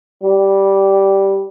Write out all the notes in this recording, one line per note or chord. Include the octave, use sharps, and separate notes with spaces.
G3